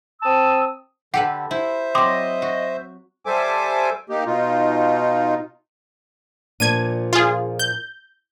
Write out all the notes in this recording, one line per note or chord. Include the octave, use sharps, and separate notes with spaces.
C4 A5 D#6 E6
D3 G4 A4 B4 F#5
E4 C5 E5
F#3 C4 D#5 C6 D6 D#6
F#4
G3 A4 C5 E5 G#5 D6
A#3 D#4 G4
B2 D#4 F4
A#2 F3 D4 G#6 D#7
F4 G#4
G6